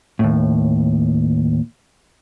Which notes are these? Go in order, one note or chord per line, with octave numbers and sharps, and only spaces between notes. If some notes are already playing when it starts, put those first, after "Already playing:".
D#2 A2